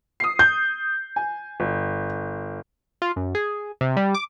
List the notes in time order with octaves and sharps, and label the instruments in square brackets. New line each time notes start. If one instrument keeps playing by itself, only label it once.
[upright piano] D#6 C7
[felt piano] G6
[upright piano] G#5
G1
[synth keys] F4
F#2
G#4
C3
G3
D6